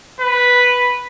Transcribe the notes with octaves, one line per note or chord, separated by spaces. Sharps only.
B4